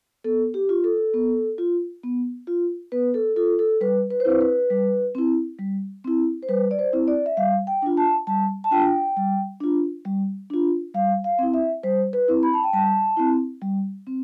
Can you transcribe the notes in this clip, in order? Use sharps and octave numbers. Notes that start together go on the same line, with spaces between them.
B3 A4
G4
F4
A4
B3
F4
B3
F4
B3 B4
A4
F4 A4
A4
G3 B4
B4
C5
C4 E4 B4
B4
G3
C4 E4
G3
C4 E4
C5
G3 B4
D5
C5
C4 E4
D5
E5
G3 F5
G5
D4 F4
A5
G3 A5
A5
D4 F4 G5
G3
D4 F4
G3
D4 F4
G3 F5
F5
C4 E4
E5
G3 C5
B4
C4 E4
B5
A5
G5
G3 A5
C4 E4
G3
C4